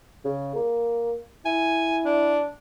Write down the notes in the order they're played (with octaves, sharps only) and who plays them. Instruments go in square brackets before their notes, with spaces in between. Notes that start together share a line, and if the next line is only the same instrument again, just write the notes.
[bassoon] C#3
A#3
[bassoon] E4 [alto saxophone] G#5
[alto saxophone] D4